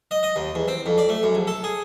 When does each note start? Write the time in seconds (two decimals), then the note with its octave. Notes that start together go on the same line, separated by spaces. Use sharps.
0.11 D#5
0.23 D#5
0.36 D#2
0.55 E2
0.68 C4
0.86 F2
0.98 D5
1.09 A3
1.23 F#2
1.35 A#1
1.47 A4
1.64 G#4